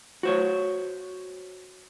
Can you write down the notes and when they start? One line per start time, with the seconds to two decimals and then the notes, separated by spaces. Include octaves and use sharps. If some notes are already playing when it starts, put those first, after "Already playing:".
0.23 F#4 C5 C#5